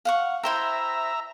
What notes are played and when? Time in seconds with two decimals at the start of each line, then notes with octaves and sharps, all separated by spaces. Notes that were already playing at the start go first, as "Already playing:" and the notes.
0.05 F5 F#5 C#6
0.43 E4 C5 E5 G5 A#5